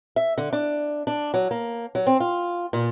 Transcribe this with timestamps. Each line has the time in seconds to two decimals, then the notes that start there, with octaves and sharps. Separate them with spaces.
0.16 E5
0.38 D3
0.53 D4
1.07 D4
1.34 F#3
1.51 A#3
1.95 F#3
2.07 C4
2.20 F4
2.73 A#2